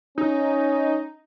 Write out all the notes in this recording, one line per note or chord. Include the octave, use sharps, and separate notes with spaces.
C#4 D#4